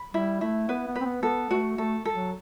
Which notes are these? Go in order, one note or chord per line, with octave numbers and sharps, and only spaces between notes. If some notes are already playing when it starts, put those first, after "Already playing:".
Already playing: B5
G3 E4
A3 E4
B3 B4
B3
B4
C4
B3
B3 A4
A3 F#4
A3 A4
A4
F#3